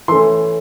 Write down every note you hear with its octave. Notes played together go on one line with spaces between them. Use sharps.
E3 A3 C#4 C6